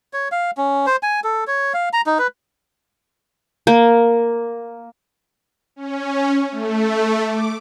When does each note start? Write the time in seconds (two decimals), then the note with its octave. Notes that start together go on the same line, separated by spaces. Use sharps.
0.13 C#5
0.32 F5
0.57 C#4
0.87 C5
1.03 G#5
1.24 A4
1.47 C#5
1.74 F5
1.93 A#5
2.06 D#4
2.19 B4
3.67 A#3
5.76 C#4
6.52 A3
7.27 D6